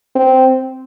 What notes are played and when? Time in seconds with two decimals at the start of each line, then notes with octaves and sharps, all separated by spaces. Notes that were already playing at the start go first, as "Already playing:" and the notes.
0.15 C4